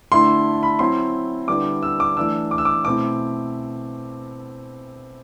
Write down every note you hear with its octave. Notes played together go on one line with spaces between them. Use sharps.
D3 A3 E4 C6
B5
F#3 C4 E4 C6
D3 G3 B3 E4 D6
E6
D6
E3 A3 D4 E6
D6
E6
D6
B2 A3 C4 E4 D6